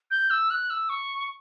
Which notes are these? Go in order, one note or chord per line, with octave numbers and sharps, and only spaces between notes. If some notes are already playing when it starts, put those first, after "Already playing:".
G6
E6
F#6
E6
C#6